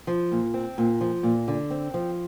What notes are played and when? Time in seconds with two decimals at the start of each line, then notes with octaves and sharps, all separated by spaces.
0.07 F3
0.31 A#2
0.54 C4
0.78 A#2
1.01 F3
1.23 A#2
1.48 D3
1.70 C4
1.94 F3